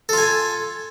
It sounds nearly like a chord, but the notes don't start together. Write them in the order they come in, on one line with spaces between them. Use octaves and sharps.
A4 F4 G#5